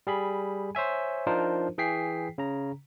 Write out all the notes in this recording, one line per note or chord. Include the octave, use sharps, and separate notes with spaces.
G3 G#4 B5
C5 C#5 E5 G#5
F3 D4 D#4 F4 A#4 C5
E3 G#4 G5 B6 C7
C#3 A#5